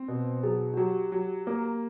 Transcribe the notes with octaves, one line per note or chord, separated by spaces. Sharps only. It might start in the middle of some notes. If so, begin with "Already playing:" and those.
Already playing: C4 C5
B2
F#3 G#4
F#4
F#3 G4
F#3
A#3